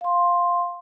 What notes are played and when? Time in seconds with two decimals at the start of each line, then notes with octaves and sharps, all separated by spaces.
0.01 F5 C6